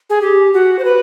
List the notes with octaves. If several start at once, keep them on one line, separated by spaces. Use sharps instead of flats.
G#4
G4
F#4
C5
B4